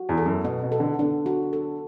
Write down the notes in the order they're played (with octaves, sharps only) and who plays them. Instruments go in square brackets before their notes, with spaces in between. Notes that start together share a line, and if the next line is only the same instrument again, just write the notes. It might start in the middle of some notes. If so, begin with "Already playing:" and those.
Already playing: [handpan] F#4
[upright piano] E2
[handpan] A4
[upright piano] F#2
[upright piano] B2 [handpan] B3
[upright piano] B2
[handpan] A4
[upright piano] D3
[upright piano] D3 [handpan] D4
[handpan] F#4
A4